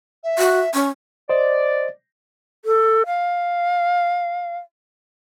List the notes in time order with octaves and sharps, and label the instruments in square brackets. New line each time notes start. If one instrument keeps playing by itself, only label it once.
[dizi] E5
[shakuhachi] F#4
[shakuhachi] C#4 [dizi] C#6
[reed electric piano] C5 D#5 [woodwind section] D5
[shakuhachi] A4
F5